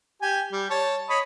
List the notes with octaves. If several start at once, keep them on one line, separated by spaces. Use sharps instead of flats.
G4 G#5
G3
C#5 A5
C#5 D#5 B5